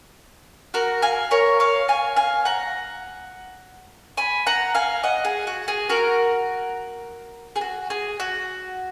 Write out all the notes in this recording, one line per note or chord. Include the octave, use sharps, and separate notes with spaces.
F#4 A#4
F5 G#5
A#4 C#5
C#5 F5
F5 G#5
F5 G#5
F#5 A#5
G#5 B5
F#5 A#5
F5 G#5
D#5 F#5
G#4
F#4
G#4
F#4 A#4
G#4
F#4
G#4
F#4